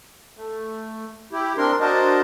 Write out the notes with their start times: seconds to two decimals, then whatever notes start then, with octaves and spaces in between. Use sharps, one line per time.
0.37 A3
1.32 E4 G4
1.58 C4 D4 A#4 C6
1.80 D4 F#4 A#4 C5 D#5 A5